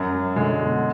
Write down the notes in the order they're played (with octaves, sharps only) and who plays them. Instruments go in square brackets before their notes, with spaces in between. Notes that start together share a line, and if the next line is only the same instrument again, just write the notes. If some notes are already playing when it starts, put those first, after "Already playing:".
Already playing: [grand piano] F#2 [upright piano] F#3
[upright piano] F#3
[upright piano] D3 [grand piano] G#3
[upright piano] B2